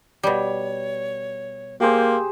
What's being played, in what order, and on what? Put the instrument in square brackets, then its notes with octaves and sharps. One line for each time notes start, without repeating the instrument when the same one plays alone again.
[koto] B2 G3 [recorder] C#5
[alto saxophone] A#3 [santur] G4 G#4 C5